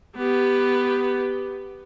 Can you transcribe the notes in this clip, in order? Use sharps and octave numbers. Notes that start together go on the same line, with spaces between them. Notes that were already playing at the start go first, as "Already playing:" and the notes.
B3 G4